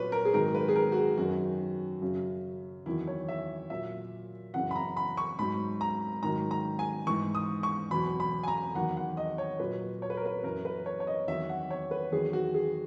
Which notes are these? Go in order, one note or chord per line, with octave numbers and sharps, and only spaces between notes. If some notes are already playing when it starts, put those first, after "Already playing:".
Already playing: A#2 F#3 B4 C#5
A#4
G#4
G#2 D#3 F#3 A#4
B4
G#4
A#4
F#4
G#4
F#2 D#3 F#3 F#4
F#2 C#3 F#3
E2 D#3 F#3 E4
C#5
E5
A#2 F#3 E5
F#2 C#3 E3 F#5
B5
A#5
B5
C#6
G#2 F#3 B5
A#5
G#2 D#3 F#3 A#5
A#5
G#5
G#2 E3 C#6
D#6
C#6
E2 B2 F#3 B5
B5
G#5
A#5
E2 D#3 F#3 F#5
F#5
D#5
C#5
A#2 F#3 B4
C#5
B4
A#4
B4
F#2 E3 A#4
B4
C#5
C#5
D#5
E2 D#3 F#3 E5
F#5
C#5
B4
E2 D#3 F#3 G#4
F#4
G#4